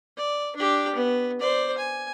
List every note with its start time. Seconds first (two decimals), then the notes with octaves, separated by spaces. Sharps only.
0.17 D5
0.56 D4 G4
0.95 B3
1.40 C5 D5
1.78 G#5